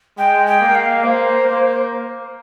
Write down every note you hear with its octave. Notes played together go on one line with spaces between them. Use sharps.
G#3 G5
G5
A#3
F5
A#3 C5
A#3